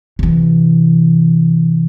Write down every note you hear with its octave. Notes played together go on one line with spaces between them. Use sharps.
C3 E3